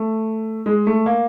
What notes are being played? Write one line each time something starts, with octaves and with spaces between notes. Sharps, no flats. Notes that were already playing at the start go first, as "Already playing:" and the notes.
Already playing: A3
G#3
A3
A#3